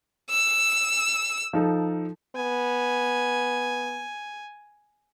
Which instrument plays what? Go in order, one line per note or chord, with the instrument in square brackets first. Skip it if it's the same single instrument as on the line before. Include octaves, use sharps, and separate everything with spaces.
[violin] E6
[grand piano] F3 D#4 A4
[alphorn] B3 [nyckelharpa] G#5